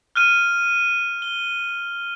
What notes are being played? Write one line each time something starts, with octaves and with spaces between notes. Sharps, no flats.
F6 F#6 D#7
G7